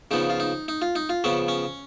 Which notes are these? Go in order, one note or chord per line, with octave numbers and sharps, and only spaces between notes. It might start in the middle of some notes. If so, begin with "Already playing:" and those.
C#3 F3 B3 D#4
F4
D#4
D#4
F4
D#4
F4
C#3 F3 B3 C#4
C#4